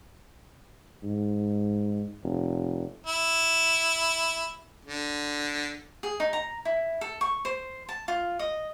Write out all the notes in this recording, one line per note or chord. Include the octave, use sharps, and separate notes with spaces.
G#2
F1
E4
D3
G#4
D#4
A#5
E4
A4
C#6
C5
A5
F4
D#5